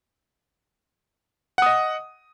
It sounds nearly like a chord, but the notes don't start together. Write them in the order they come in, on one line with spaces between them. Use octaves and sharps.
F#5 D#6 D#5